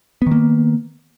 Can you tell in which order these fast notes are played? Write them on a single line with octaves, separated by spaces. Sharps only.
B3 D#3 A#3